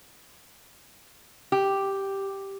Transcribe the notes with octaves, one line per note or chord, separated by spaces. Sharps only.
G4